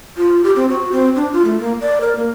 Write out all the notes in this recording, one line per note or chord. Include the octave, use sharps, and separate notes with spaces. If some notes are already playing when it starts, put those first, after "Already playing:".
F4
G4
C4
F#4
C4
D4
F4
A3
A#3
D5
A#4
A#3